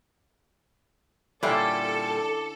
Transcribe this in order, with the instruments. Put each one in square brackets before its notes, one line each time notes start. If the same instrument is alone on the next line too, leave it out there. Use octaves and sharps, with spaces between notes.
[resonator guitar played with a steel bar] A#2 G3 [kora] D3 C#4 E4 [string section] A4 [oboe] D5